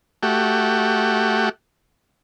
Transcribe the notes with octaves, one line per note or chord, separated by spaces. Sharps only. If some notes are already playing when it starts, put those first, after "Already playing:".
A3 F#4 G4